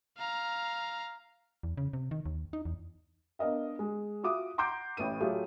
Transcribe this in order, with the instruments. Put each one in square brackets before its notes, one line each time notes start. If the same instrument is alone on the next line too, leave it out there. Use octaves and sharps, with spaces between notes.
[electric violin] F5 A#5
[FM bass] E2
C#3
C3
D#3
D#2
D#4
E2
[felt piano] B3 D4 A#4 D#5 F5
G#3
F4 F#4 E5 D6 D#6
F#5 A#5 C6 D6 G6 D7
A1 A2 B4 D#7
F#3 A3 F4 G4 G#4 C#5